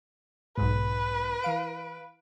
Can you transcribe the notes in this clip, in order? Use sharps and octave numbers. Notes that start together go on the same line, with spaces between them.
B1 G#2 B4
E3 F5 D7